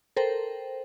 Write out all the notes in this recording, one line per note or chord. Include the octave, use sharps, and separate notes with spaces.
A4 A#4 C5 G5